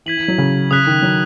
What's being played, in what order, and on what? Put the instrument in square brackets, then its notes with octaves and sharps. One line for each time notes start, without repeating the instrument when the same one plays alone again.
[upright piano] E3 [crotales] G#6 B6 D#7 F#7
[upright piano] E3
F#3
C#3
[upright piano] C#3 [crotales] D#6 F#6 B6
[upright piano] D#3
F#3